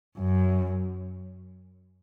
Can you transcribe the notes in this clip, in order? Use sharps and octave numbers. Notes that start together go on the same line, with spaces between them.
F#2